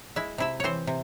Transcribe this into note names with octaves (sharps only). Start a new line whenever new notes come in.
G#3 E4 E5
C3 E4 E5
E3 C4 C5 C#5
C3